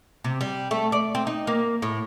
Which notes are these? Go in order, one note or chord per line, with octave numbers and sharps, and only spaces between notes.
C3
G3
A3
D5
C4
D#4
A#3
A2